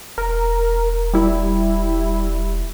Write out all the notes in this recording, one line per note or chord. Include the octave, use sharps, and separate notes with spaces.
E1 A#4
G3 E4